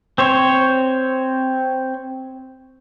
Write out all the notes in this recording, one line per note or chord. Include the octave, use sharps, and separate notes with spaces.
C4 C5 C#5